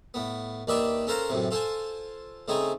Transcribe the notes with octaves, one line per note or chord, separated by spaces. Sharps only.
A2 B3
D#2 D#3 D4 B4 E5 D6
C#4 A4 A#4 C5 F5 A#5
F#2 A2 C3
F4 A4 C5 G#5
C#3 A3 C4 D#4 G#5